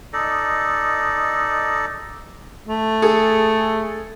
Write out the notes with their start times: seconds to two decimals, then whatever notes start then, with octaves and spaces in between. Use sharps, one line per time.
0.13 D#4 A4 D5 D#5
2.68 A3
3.02 G#4 A4